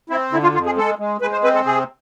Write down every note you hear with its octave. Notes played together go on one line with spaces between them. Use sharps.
C4 E4
D3 E4
F4
F2 F4
G#4
G#3 A4
G#3
G#3 B4
C5
C4 B4
A4
C3 G#4